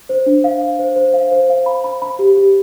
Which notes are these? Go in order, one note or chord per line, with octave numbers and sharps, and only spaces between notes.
C5
D4
F5
F5
C5
C5
F5
C5
F5
B5
B5
B5
G4
G4